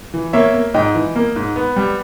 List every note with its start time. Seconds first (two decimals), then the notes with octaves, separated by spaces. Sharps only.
0.14 E3
0.33 A#3 C#5 E5
0.54 A#3
0.74 G#2 D#5 G5
0.95 E3
1.16 A#3
1.36 G#2
1.56 B3
1.76 G3